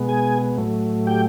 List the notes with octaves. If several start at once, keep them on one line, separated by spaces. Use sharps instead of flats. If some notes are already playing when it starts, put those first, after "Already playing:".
Already playing: B2 G#3 B3
G#4 G#5
A2 F#3 A3
G4 G5